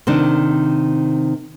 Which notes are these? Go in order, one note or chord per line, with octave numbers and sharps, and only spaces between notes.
C3 D#3 D4